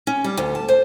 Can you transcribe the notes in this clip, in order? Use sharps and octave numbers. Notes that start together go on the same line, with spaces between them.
C#4
G3
D2
A5
C5